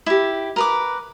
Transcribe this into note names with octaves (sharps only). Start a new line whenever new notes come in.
E4 G4
A#4 B4 D6